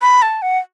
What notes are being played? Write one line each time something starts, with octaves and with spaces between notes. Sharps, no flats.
B5
A5
F#5